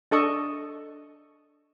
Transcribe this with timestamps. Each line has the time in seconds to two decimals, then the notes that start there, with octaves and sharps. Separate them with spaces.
0.11 D4 A4 D#5 C#6